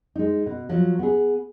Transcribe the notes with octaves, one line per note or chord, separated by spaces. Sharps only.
G#3 D#4
B2
F3 F#3
B3 G#4